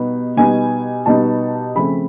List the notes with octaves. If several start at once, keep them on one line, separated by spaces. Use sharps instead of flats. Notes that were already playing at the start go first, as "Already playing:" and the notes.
Already playing: B2 G3 B3 D#4
B2 G3 B3 D#4 G#5
B2 G3 B3 D#4 A5
C#3 F3 A3 C4 B5